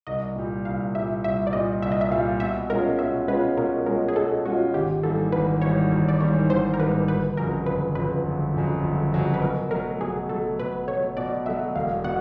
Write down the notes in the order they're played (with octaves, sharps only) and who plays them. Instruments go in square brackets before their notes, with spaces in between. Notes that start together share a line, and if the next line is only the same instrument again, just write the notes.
[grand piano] C2 [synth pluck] D#5
[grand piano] A#2 G3
[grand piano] C2 [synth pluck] F5
[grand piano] A#2 G3 [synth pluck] E5
[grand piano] C2 [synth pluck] E5
[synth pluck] D5
[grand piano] A#2 G3 [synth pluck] D#5
[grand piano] C2 [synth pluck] E5
[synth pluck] D#5
E5
[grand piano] A#2 G3 [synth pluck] F5
[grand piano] B2 [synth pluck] E5
[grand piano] G#3 C#4 F4 [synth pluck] A#4
[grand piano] B2 [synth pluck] E5
[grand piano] G#3 C#4 F4 [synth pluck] B4
[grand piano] B2 [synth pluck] A#4
[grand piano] G#3 C#4 F4 [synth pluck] A#4
[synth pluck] G#4
[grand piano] B2 [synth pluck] A4
[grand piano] G#3 C#4 F4 [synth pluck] F#4
[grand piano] G#1 [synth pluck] G4
[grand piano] G#2 E3 G3 A#3 [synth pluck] A4
[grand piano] G#1 [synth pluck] B4
[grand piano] G#2 E3 G3 A#3 [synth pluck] C#5
[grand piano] G#1 [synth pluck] C#5
[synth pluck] D5
[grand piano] G#2 E3 G3 A#3 [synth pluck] C#5
[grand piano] G#1 [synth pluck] C5
[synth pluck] A#4
[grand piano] G#2 E3 G3 A#3 [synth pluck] B4
[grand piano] G1 [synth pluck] B4
[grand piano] F2 C#3 F#3 [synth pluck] A#4
[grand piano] G1 [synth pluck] B4
[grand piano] F2 C#3 F#3 [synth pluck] B4
[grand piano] G1
F2 C#3 F#3
G1
F2 C#3 F#3
[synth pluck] B4
[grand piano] B2 [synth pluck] A#4
[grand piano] F#3 A3 [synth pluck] A#4
[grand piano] B2 [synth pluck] G#4
[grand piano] F#3 A3 [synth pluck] A4
[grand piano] B2 [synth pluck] B4
[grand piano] A3 [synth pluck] C#5
[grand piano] F#3
[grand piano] B2 [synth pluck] D5
[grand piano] F#3 A3 [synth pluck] E5
[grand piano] E1 [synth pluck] F5
[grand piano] B2 [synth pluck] F#5